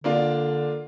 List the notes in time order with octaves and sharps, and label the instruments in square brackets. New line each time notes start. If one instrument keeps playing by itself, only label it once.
[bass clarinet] D3 [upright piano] A#3 D4 F4